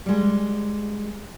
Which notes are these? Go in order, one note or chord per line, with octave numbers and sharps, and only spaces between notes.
G3 G#3